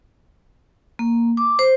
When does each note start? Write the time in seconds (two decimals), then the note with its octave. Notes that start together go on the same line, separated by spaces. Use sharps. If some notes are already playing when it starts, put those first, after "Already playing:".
0.99 A#3
1.37 D6
1.59 C5